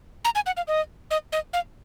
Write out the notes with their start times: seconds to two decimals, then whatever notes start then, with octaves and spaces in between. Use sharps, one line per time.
0.25 A#5
0.35 G#5
0.46 F#5
0.57 F5
0.68 D#5
1.11 D#5
1.32 D#5
1.53 F5